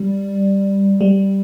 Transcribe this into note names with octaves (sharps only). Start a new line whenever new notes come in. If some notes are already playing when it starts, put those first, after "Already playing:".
Already playing: G3
G3